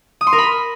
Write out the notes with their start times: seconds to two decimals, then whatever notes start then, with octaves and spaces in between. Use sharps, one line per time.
0.21 D#6
0.27 C6
0.33 A#4
0.38 B5